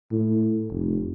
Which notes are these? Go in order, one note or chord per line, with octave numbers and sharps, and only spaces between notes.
A2
F1